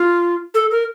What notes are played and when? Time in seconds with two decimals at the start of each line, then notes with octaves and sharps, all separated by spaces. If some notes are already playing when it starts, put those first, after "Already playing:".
Already playing: F4
0.54 A4
0.71 A#4